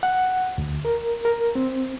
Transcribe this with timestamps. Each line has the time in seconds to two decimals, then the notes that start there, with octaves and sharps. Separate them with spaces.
0.03 F#5
0.58 D2
0.85 A#4
1.25 A#4
1.55 C4